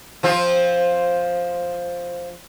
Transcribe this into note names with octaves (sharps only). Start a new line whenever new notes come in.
F3 C4 F4